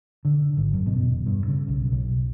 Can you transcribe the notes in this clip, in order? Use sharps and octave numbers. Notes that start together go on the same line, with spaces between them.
D3
G#1
F#2
B2
E1
G2
C#3
B1
B1